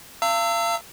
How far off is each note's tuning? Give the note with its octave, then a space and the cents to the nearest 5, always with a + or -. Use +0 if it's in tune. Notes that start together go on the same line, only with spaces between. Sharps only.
F5 -35 A#5 -45 E6 +0